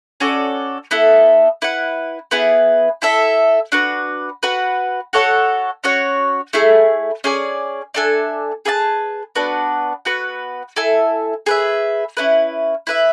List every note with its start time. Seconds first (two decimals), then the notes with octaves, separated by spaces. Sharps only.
0.20 C#4 F#4 A4 D5
0.91 B3 E4 A4
1.62 E4 B4 F#5
2.31 B3 E4 G#4 B4
3.02 E4 A4 E5
3.72 D4 F#4 B4
4.43 F#4 B4 F#5
5.13 F#4 A4 C#5 F#5
5.84 C#4 F#4 C#5 F#5
6.53 A3 E4 G#4
7.24 C#4 G#4 D5 G#5
7.94 D4 A4 E5 G#5
8.65 G#4 B4 E5 A5
9.35 B3 D4 F#4 B4
10.05 B3 F#4 B4
10.76 E4 A4 E5 G#5
11.46 G#4 B4 E5
12.17 C#4 E4 B4
12.87 E4 B4 E5